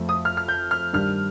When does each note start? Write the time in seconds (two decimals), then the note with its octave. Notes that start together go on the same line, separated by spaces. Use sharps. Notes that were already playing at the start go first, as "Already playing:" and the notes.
Already playing: F2 F3 A3
0.09 D#6
0.25 F6
0.37 F6
0.48 G6
0.71 F6
0.93 G2 D#3 G3 D4 F6